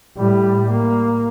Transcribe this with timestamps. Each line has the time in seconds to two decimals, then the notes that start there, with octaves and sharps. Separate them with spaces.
0.17 A2 G3
0.71 A#3